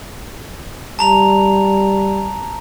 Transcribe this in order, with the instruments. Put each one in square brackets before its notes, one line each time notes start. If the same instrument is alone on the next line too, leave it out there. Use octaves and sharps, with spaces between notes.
[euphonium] G3 [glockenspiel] A5 A#5 F7